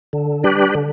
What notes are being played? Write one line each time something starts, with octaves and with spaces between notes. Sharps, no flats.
D3
G3 D4 G4 B4
D3